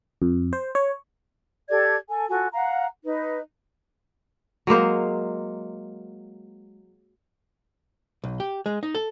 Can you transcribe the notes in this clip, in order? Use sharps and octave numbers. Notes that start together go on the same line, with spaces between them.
F2
C5
C#5
G4 A4 D5 G#6
A4 G#5
F4 F#4 A4 G#5
F5 F#5 A#5
D#4 B4
F#3 G#3 A#3 C5
B1
G4
G#3
D#4
A4